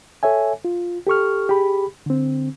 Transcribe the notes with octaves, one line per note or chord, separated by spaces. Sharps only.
A4 C#5 E5 G#5
F4
G4 A4 C#6 F6
G4 G#4 B5
D3 C4